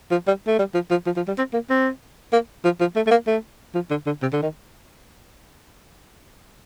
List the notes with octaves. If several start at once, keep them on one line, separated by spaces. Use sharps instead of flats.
F3
G3
A3
G3
F3
F3
F3
F3
G3
C4
A#3
C4
A#3
F3
F3
A3
A3
A#3
A3
F3
D3
D3
C3
D3
D#3